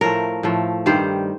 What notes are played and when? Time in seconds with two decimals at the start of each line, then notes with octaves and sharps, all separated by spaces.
0.01 A2 F3 A3 A#4
0.43 A2 F3 A3
0.86 G2 D#3 G3 C5